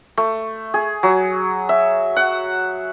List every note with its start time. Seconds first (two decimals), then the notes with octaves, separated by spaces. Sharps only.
0.17 A3
0.74 G#4
1.03 F#3
1.69 E5
2.16 F#5